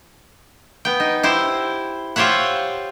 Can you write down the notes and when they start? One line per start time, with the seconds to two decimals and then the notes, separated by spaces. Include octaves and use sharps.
0.85 B3 G5
1.00 D#4
1.23 E4 G4 C5 E5
2.16 F4 G4 C5 C#5 E5 F#5